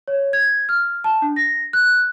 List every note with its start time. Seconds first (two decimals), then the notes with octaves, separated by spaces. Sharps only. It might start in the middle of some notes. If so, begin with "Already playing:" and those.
0.08 C#5
0.33 G#6
0.69 F6
1.04 A5
1.22 D4
1.36 A#6
1.73 F#6